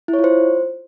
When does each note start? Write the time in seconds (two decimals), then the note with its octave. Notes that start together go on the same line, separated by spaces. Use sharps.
0.08 E4
0.13 C#5
0.19 F4
0.24 C5